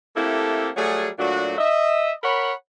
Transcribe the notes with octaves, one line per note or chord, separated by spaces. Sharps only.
A3 A#3 C4 E4 G4 A4
F#3 G3 A3 F#4 G#4
A#2 F#3 A3 D4 F#4
D#5 E5
A#4 C#5 F#5 B5